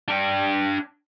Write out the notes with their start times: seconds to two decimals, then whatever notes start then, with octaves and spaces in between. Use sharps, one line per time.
0.08 D4 G5